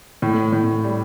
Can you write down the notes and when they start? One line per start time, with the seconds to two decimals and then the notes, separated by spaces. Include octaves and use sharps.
0.22 A2
0.53 A2
0.84 G3